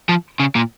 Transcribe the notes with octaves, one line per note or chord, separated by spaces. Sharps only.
F3
C#3
A#2